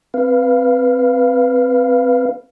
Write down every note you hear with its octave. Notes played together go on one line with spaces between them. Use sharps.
C4 B4 F5